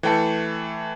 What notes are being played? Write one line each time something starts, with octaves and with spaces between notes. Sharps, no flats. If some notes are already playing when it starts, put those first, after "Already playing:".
E3 A3 G5 A5 C#7